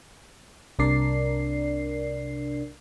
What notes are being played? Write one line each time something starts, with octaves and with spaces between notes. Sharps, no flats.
C2 C3 D4 A#4 D5 C7